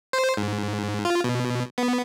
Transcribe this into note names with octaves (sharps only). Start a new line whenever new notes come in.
C5
G#2
F4
B2
B3